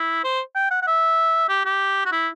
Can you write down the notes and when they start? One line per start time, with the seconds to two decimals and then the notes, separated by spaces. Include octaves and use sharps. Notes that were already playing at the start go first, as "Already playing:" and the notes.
Already playing: E4
0.24 C5
0.56 G5
0.71 F#5
0.82 F#5
0.87 E5
1.49 G4
1.65 G4
2.06 F#4
2.12 E4